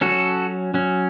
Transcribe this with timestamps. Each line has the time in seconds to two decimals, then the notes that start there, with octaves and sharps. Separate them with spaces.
0.01 F#3 C#4 F#4 A4
0.74 F#3 C#4